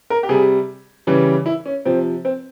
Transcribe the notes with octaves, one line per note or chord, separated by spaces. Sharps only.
A#4
G4
C3 G3 G#4
C#3 E3 G3
E4
C#4
C3 F3 C4
C4